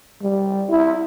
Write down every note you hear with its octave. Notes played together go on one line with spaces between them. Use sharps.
G3
E4